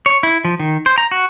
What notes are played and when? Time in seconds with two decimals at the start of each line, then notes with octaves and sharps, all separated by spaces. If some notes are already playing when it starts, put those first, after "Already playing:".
0.06 C#5
0.23 E4
0.45 F3
0.59 D#3
0.86 C5
0.98 A#5
1.11 F#4